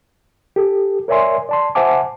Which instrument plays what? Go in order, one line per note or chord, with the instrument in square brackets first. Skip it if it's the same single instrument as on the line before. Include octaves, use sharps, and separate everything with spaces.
[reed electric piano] G4 A4
A#4 C#5 D5 E5 G#5 C6
D5 A5 C6
C5 E5 F#5 G#5 A5 D6